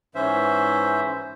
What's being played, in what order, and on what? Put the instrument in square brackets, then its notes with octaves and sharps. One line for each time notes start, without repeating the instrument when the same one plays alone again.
[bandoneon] G#2 E3 C#4 C5 E5